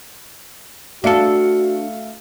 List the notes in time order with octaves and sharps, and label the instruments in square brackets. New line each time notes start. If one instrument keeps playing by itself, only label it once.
[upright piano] A3 F5 C#7 [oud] D4 A4 [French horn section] F#4